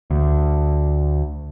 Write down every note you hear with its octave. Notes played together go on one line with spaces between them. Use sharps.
D2